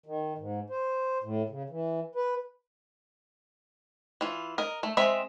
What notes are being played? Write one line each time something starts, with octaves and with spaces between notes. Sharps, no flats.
D#3
G#2
C5
A2
C#3
E3
B4
E3 F4
A#4 D#5
A3
G#3 C4 E5